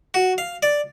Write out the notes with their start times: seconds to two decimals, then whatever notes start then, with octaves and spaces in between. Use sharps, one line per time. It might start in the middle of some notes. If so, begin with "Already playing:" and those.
0.14 F#4
0.38 F5
0.63 D5